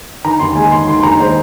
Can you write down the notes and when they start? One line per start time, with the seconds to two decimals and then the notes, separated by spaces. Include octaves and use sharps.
0.24 D#3 A#5
0.40 D#2 C6
0.56 G#3 G#5
0.71 D#2 C6
0.87 D#3 C6
1.00 C6
1.03 D#2 A#5
1.19 G#3 C5